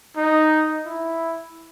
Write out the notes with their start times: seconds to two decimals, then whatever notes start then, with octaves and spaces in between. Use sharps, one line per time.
0.17 D#4
0.86 E4